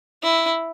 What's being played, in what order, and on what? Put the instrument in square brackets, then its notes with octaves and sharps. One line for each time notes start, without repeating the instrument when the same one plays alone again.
[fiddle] E4